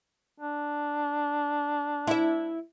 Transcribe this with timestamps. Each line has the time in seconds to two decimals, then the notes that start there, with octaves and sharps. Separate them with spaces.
0.40 D4
2.07 E4 E5